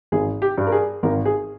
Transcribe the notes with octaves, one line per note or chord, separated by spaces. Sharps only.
G#1 G#4
G4
G2 G3
A#4
G#4
G#1 A#4
G#4